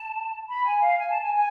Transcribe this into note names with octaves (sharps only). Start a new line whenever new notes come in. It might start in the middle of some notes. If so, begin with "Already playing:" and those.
Already playing: A5
B5
G#5
F5
G#5
A5
G#5
G#5